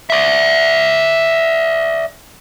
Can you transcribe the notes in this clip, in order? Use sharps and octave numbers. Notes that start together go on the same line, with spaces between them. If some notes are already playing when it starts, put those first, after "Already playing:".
D5 E5